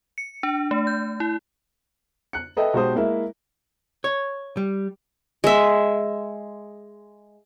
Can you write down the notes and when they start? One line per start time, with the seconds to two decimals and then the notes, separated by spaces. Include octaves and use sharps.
0.18 C#7
0.43 D4
0.71 A3
0.87 G6
1.20 E4
2.33 F#6 C#7
2.57 A4 B4 D#5 E5 G5
2.73 B1 G#3 F#4 G4 C5 D#6
2.95 G#3 A#3 E4 E5
4.04 C#5
4.57 G3
5.44 G#3 E5